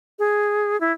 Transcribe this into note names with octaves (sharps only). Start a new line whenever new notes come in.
G#4
E4